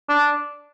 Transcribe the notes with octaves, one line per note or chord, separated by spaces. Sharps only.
D4